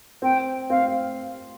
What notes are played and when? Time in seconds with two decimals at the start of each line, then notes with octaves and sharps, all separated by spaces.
0.22 C4 G5
0.70 C4 F5